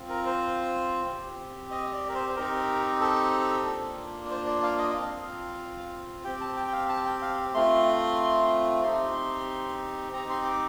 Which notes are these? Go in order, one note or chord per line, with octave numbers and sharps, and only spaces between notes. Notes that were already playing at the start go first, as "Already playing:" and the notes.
Already playing: C4 F4
A#4
C5
C4 G4
D#5
D5
A#4
C5
C5
C4 D#4 G4 A#4
A4
A#3 D4 F4
D5
C5
D5
F5
D#5
D#5
C4 F4 F5
C4 G4 G5
A5
G5
G5
F5
A5
G5
F5
A3 C4 F4 C6
C4 D#4 G4 C6
C4 D#4 G4 A#5
C6
D6